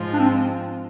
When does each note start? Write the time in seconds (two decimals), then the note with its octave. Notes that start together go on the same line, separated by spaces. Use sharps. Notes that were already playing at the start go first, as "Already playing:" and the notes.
Already playing: G#2 F3 G#3
0.14 D4
0.20 C4